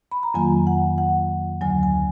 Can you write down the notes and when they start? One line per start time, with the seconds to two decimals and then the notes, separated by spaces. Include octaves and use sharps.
0.12 B5
0.23 A#5
0.34 F2 D#3 F#3 A#3 F4 G#5
0.67 F#5
0.98 F#5
1.61 D2 D3 F#3 G#5
1.83 G#5